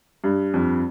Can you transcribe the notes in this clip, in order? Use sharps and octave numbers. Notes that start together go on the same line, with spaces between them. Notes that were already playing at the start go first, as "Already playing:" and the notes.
G2
F2